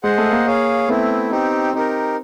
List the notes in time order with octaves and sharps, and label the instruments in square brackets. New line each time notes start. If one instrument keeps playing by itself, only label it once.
[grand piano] G#3 [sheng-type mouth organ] G#4 C5 D#5 F#5
[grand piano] A3
A#3
[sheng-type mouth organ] G#4 C#5 F5
[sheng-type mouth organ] A3 C4 E4 [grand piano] B3
[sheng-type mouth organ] C4 D#4 G4
[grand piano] C4 [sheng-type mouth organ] D#4 G4 A#4